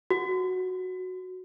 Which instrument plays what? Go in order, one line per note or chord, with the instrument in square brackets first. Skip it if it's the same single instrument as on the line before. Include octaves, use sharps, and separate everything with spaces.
[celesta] F#4